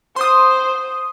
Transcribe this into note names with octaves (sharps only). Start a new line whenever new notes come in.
C5 C6 D#6